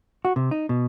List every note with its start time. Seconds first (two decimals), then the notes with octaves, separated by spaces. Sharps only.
0.25 F#4
0.36 C3
0.51 D#4
0.69 B2